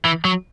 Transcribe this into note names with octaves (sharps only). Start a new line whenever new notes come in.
E3
F#3